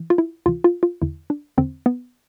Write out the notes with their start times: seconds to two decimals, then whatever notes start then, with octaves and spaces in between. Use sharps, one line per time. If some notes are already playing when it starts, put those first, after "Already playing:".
Already playing: E3
0.10 F4
0.18 E4
0.46 D2 C3 E3 F4
0.64 F4
0.83 F4
1.02 E2 D3 E4
1.30 D4
1.58 E2 D3 C4
1.86 B3